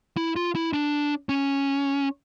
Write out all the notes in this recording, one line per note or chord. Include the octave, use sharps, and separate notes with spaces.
E4
F4
E4
D4
C#4